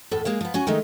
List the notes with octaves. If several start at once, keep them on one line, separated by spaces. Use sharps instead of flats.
E2 A2 A4
G#3 A#3 G#4
F3 B3
C#4 F#4 G#5
D#3 G#3 A3 D#4